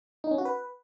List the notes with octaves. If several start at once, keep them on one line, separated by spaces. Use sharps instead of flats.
D#4
C#4
F#4
B4